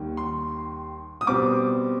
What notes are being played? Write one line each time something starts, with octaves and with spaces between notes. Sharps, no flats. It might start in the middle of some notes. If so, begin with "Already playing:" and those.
Already playing: D#2 D#3 G3
C6
D#6
B2 G3 C4 D6